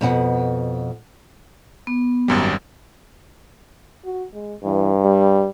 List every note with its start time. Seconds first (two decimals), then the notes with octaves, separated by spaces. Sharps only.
0.01 F2 B2 B4 F#5
1.87 B3
2.28 G#1 F#2 G3
4.05 F#4
4.33 G#3
4.64 G2 E3
5.05 G3